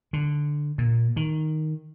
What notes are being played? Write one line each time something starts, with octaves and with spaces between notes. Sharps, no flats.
D3
A#2
D#3